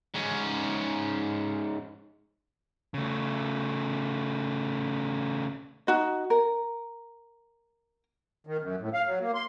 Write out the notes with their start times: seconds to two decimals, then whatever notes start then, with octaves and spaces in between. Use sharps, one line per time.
0.14 G#2 C#4
2.94 C#3 A3
5.87 D#4 F#4 D#5
6.30 A#4
8.47 D#3
8.61 F#2
8.80 A2
8.94 F5
9.06 F#3
9.21 A#3
9.34 C6